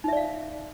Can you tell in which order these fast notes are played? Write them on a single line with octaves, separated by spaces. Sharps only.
D#4 E5 D5 F5